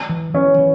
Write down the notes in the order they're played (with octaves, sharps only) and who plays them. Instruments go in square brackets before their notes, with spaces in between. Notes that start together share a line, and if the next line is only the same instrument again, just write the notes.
[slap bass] E3
[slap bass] E3 [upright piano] C#4
[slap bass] E3